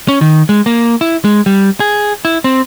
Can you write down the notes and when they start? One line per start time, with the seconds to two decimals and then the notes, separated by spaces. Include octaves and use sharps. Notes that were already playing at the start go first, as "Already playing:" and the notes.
0.08 C#4
0.21 D#3
0.49 G#3
0.66 A#3
1.01 E4
1.25 G#3
1.46 G3
1.80 G#4
2.25 E4
2.44 C4